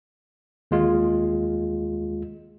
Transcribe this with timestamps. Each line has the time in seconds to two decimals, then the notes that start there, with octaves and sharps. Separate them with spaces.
0.71 D#2 G#3 F4